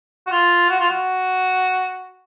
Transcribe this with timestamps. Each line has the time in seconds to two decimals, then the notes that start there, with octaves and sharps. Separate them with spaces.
0.27 F#4
0.31 F4
0.69 F#4
0.79 F4
0.90 F#4